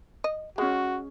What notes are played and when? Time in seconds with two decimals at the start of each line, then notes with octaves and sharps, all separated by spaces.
0.24 D#5
0.58 G#3 C#4 F#4 G#4